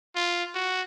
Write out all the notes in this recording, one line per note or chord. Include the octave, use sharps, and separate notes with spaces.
F4
F#4